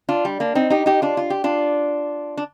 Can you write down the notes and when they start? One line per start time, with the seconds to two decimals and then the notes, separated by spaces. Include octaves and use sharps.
0.09 D4 F4
0.25 G3
0.40 A#3 D4
0.55 C4 D#4
0.70 D#4 G4
0.86 D#4 G4
1.02 D4 F4
1.17 F4
1.30 G4
1.44 D4 F4
2.37 D4